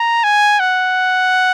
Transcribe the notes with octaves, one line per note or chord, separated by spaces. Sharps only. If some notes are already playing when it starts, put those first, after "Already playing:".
Already playing: A#5
G#5
F#5